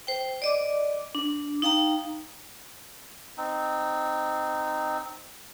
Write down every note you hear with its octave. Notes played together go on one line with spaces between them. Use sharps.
C5 G5
D5 D#5 D6
D4
D#4 F5 G5 A#5
C4 D#4